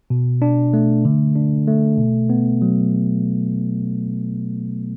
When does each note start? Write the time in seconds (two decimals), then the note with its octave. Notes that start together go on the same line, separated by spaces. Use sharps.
0.10 B2
0.42 D4
0.74 A3
1.05 D3
1.36 D4
1.68 A3
1.98 B2
2.30 B3
2.62 F#3